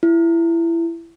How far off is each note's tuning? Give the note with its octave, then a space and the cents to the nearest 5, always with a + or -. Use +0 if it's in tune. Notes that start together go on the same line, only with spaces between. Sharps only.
E4 +20